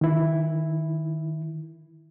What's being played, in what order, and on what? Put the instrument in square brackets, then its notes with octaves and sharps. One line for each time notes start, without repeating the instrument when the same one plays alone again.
[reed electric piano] D#3 E4